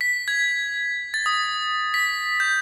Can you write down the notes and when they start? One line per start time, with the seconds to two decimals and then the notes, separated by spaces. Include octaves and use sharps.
0.01 B6
0.28 G#6
1.14 A6
1.26 D#6
1.94 B6
2.40 G6